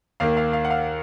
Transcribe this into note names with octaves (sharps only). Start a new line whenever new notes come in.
D#2 D#3 A#3 F5
F5
F5
F#5
F5